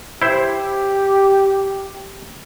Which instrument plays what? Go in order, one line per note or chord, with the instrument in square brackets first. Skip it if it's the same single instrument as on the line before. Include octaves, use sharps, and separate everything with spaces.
[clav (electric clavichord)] E4 C5 [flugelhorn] G4